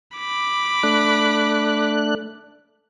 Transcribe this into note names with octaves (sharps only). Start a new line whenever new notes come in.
B5 D6
A3 D4 F#6